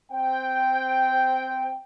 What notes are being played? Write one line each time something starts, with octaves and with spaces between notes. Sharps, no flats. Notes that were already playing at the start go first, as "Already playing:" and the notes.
C4 C5 G5